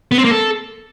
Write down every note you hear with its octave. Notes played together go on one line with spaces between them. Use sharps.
B3
C4
A#3
A4